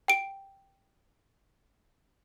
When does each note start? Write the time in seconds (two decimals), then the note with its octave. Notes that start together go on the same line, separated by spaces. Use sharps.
0.08 G5 D7